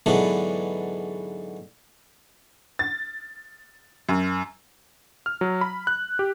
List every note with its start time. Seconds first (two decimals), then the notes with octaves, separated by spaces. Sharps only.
0.06 G#2 D3 E3 F#3 B3 D4
2.79 A6
4.09 F#2
5.26 F6
5.41 F#3
5.61 B5
5.87 F#6
6.19 G4